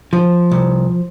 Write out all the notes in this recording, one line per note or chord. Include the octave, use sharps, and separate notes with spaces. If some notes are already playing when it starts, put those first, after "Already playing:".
F3
C2